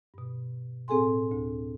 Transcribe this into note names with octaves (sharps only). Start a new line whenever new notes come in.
G2 B2
A2 C4 G#4 A4 G#5 C6
D2